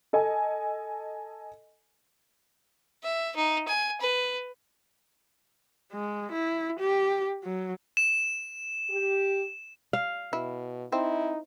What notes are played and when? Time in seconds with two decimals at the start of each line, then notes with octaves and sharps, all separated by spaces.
0.13 A4 D#5 G#5
3.03 E5
3.36 D#4
3.68 G#5
4.01 B4
5.92 G#3
6.32 E4
6.79 G4
7.44 F#3
7.97 E7
8.90 G4
9.93 F5
10.33 B2 E4
10.92 C4 D#4 E4